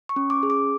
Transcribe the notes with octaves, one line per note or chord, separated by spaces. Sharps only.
C#6
C#4
D6
G#4
D6